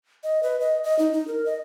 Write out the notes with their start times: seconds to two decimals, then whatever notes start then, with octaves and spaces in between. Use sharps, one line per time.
0.24 D#5
0.43 B4
0.60 D#5
0.84 D#5
0.99 D#4
1.13 D#4
1.28 A#4
1.46 D#5